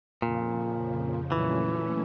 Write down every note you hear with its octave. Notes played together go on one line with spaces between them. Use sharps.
F2 A#2 C#3 F3
A#2 E3 F#3 A3 C#4